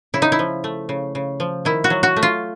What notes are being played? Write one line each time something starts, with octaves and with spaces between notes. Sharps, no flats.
C#3 E4
D#4
E4
F3
A3
C#3
C#3
F3
D#3 E4
F#4
F#3
F#4
A3
F4